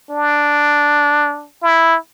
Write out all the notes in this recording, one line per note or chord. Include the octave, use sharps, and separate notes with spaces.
D4
E4